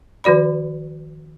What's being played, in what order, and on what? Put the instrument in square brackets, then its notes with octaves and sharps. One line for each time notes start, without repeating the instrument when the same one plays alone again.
[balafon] D#3 F3 F#4 D5 B5